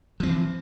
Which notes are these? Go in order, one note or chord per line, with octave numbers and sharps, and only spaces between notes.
E3 F3 C4